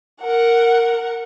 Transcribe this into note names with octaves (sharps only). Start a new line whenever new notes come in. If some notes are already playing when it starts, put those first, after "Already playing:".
A#4 F#5